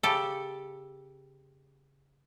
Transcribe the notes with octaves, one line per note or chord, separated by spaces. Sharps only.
C#3 G4 A4